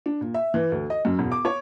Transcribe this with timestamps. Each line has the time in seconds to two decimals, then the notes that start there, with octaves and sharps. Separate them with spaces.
0.06 D4
0.21 A#2
0.34 E5
0.54 E3
0.72 D2
0.90 D#5
1.05 F#2
1.19 E1
1.32 D6
1.45 C#5